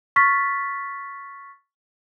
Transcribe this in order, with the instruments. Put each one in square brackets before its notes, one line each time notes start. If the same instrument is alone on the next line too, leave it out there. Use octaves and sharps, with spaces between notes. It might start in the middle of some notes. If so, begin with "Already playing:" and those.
[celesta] C#6 F6 A6 B6